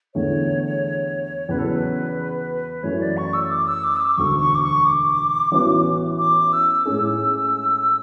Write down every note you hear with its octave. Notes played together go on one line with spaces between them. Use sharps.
E2 D3 A3 C#5
E2 C#3 F#3 B4
A4
B4
F#2 E3 A3 C#5
D5
C#6
E6
D6
E6
D6
E6
D6
E1 D2 D3 C#6
C#6
D6
C#6
D6
A1 A2 E3 B3 F#4
D6
E6
A2 G#3 C#4 G#4 E6